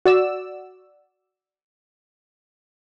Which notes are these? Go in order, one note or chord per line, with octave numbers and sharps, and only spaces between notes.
F#4 D5 E6